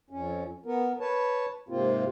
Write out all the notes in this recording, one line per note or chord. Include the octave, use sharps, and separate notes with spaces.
F2 C#4
B3 A#4
B4 C#5 A5
G#2 C3 A#3 C4 F4